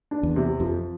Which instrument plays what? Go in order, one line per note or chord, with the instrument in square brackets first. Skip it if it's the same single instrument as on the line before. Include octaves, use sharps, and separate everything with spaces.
[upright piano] D4
[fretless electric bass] E2
[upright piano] C3
[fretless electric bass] F2 [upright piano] F3